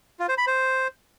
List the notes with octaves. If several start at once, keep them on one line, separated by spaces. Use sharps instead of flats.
F4
C5
B5
C5